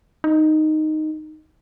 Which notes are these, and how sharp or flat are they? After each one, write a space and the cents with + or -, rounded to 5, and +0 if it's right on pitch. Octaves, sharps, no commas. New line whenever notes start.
D#4 -5